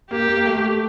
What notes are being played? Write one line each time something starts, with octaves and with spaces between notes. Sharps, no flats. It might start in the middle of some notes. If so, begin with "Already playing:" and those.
A#3 G4
A#3
A3